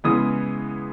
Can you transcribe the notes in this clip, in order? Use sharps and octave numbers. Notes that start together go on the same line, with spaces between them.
C#3 E3 G#3 B3 D#6